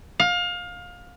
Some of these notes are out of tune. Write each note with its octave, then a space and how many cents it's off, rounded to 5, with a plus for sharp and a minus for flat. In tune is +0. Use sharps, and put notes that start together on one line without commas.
F5 +25